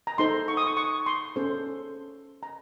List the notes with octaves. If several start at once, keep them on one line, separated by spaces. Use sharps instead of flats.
A#5
D#4 A4 C5 C6
C#6
D#6
C#6
C#6
C6
C#4 A4 C5
A#5